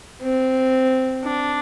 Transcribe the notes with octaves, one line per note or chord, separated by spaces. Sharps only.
C4
D4